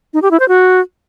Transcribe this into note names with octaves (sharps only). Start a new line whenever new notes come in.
D#4
G4
E4
C5
F#4